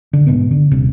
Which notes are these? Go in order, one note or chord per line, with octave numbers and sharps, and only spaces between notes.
D3
G#2 B2 B3
D3
D#1 C3